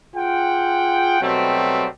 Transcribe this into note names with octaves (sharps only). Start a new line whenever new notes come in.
F4 G#4 F#5 G5
B2 F#3 G3 A3 C4